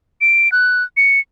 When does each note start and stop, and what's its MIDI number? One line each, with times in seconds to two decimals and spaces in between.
0.21 0.51 98
0.52 0.83 90
0.97 1.20 97